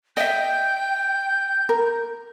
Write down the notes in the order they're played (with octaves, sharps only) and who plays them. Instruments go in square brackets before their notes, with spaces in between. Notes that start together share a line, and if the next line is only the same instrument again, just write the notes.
[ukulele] D#5 E5 [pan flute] G5 [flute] G6
[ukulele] A#4